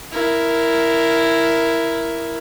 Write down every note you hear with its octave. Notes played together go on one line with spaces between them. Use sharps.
E4 A#4